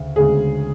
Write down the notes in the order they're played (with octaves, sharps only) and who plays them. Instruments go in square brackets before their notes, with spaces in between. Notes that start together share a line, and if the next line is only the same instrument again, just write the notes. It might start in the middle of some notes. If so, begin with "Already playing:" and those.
Already playing: [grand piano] D2 C#3
D2 C#3 G#3 G#4